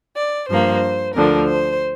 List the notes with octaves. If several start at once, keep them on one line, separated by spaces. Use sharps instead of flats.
D5
G2 F3 A#3 C5
D2 D3 F3 A#4
C5